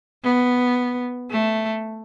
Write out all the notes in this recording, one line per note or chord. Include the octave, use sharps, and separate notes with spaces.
B3
A3